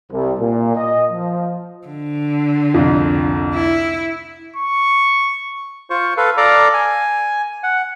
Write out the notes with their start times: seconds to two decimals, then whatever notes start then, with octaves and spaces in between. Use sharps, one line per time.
0.12 C2
0.40 A#2
0.76 D#5
1.11 F3
1.88 D3
2.74 C2 F2
3.55 E4
4.56 C#6
5.90 F4 C5 C#6
6.17 A4 B4 F5
6.37 A4 D5 F5 A#5 D6
6.74 G#5
7.63 F#5